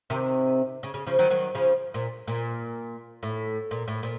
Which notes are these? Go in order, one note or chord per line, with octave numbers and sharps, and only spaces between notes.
C3 D#3
C#3
C#3
C#3 F3
D#3 F#3
D#3 F#3
C#3 F3
A#2
A#2
A2
A#2
A2
A#2